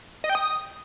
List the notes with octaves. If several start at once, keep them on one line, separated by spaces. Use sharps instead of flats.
D#5
G5
D#6